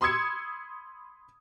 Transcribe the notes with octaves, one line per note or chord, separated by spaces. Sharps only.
B5 C6 D#6 E6 G#6 C#7